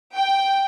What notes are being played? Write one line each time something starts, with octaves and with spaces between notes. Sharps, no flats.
G5